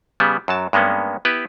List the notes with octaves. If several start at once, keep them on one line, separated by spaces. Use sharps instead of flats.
C#3 G3 B3
F#2 F#3 A5
G2 G#3 A#3 B3 C#4
B3 E4 G4 B4